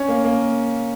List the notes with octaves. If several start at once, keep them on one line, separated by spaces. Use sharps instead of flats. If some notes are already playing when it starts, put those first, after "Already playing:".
Already playing: C#4
A#3
A#3